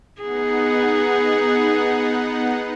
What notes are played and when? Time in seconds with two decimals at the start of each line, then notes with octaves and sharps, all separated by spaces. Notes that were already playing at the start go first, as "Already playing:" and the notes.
0.22 B3 D#4 G#4 F#5